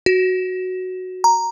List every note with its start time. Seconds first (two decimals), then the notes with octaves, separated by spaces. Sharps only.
0.06 F#4
1.24 A#5